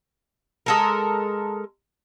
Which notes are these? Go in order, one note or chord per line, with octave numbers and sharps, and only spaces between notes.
G#3 A4 A#4